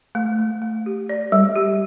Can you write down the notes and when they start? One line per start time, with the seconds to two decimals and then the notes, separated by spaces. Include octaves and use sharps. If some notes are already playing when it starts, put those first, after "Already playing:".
0.15 A3
0.39 A3
0.62 A3
0.86 G4
1.09 D5
1.32 G3
1.56 G4